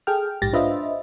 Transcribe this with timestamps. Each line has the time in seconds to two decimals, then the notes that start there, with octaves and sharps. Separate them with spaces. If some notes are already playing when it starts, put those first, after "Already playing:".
0.07 G#4 A4 G5 F6
0.42 A#1 G#2 G4 A6 A#6
0.53 D4 F4 B4 C5 D#5 E5